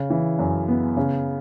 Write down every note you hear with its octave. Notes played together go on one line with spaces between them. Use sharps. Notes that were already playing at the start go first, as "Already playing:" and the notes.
Already playing: C#3
E3
F#2
B3
C#3